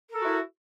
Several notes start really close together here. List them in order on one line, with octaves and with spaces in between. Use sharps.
A#4 A4 F#4 E4